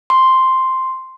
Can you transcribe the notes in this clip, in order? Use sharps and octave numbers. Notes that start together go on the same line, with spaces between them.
C6